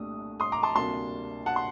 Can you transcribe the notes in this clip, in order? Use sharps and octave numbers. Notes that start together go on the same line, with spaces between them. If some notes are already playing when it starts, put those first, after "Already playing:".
Already playing: C2 A#2 A3 D4 D#6
C6 D#6
A#5 D6
A5 C6
D2 C3 G3 A#3 D4 A5 C6
F#5 A5
C6